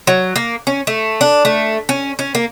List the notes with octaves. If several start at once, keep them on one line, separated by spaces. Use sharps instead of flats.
F#3
A#3
C#4
A3
D4
A3
C#4
C#4
A#3